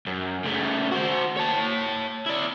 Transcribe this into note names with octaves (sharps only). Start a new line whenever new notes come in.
F#2
C#3 A3
F#4 C5
C#5 A5
E4 D5